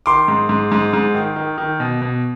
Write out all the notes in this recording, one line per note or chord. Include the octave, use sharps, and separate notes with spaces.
D#3 C6 D6
G#2
G#2
G#2
G#2
D#3
D#3
D#3
B2
B2